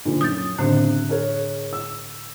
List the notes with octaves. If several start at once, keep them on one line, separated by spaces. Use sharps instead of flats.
A#2 D3 F3
F#2 D#6 G6 A6
F#1 A2 D3 C4 D4 F#6
G#4 A#4 C#5
E6